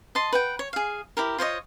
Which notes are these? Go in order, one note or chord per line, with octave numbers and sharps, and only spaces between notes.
D#5 A5 C6
B4 F#5 G5
C#5
G#4 F5
E4 G4 A#4
F4 C5 C#5 D#5